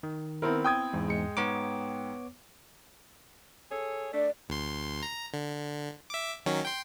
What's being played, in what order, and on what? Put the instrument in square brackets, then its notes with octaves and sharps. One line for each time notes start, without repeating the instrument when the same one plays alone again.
[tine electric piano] D#3
[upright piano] B3 C4 E4 [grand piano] A#4
[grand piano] G5 D#6 G#6
[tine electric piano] E2 G#2
[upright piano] G#3 C#7
[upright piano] G#2 [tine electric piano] B3 C#5 D6
[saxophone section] G#4 A4 C#5
[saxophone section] A3 D4 [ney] D5
[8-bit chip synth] D2 C6
A#5
D3
E5 D6
D#3 F#3 C#4
G5 C6